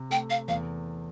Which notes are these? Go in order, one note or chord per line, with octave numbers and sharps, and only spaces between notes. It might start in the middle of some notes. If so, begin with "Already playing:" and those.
Already playing: C3
A3 G5
F5
E2 F5